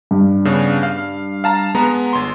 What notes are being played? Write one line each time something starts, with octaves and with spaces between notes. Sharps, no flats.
G2
C#3 B3 D4
F5
F5 A5 A#5
G#3 B3 A#5
G1 C6